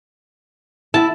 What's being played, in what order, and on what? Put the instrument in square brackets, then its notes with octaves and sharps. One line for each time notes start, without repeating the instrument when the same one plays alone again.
[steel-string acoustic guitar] E4 [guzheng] A5